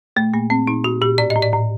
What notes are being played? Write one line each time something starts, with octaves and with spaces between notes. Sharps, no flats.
A#2 A3
A#2 A#3
A#2 C4
A#2 D#4
A#2 F#4
A#2 G4
A2 D5
D#5
A2
D5
A2